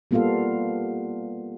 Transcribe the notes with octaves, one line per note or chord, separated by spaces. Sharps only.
G3 A#3 B3 F4 A4 F5